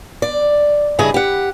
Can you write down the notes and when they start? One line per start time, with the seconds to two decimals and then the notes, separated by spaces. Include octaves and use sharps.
0.22 D5
0.99 G2 C#3 E4 G#4 D#5
1.14 G4 F#5